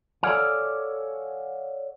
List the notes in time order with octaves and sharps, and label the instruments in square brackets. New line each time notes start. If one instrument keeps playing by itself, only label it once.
[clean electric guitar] A4 C#5 D5 F5 F#5 G#5